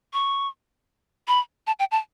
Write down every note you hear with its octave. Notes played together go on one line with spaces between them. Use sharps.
C#6
B5
A5
G5
A5